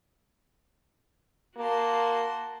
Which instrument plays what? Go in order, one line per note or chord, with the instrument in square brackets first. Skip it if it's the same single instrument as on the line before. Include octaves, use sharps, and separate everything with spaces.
[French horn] A#3 [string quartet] F#4 A5 C6